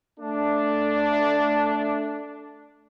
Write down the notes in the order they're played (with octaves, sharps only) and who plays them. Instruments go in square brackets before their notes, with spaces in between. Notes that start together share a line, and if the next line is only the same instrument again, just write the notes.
[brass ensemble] A3 D4